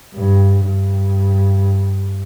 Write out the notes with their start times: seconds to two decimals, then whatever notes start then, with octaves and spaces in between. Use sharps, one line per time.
0.15 G2
0.66 G2